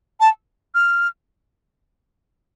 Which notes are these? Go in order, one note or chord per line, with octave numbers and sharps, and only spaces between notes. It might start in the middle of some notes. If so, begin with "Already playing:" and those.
A5
F6